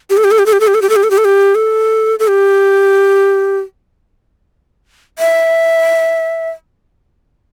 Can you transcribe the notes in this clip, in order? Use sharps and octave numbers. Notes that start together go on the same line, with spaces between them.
G4
A4
G4
A4
G4
A4
G4
A4
G4
A4
G4
A4
G4
A4
G4
A4
G4
A4
A4
G4
E5